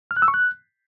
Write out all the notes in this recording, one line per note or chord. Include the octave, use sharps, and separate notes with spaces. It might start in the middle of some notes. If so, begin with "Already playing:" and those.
F6
F#6
E6
C#6
F#6